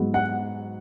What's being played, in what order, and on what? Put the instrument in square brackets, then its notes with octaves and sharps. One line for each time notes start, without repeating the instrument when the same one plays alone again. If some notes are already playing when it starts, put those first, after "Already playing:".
Already playing: [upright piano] G#2 F#3 B3
F#5